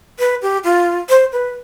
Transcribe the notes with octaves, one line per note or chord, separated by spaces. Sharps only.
B4
G4
F4
C5
B4